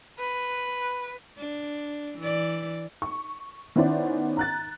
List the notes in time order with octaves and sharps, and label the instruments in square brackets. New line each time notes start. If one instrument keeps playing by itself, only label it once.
[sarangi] B4
[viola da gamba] D4
E3 D5
[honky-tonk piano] C#6
D#3 B3 C#4 E4 C5 D5
A#5 F#6 A6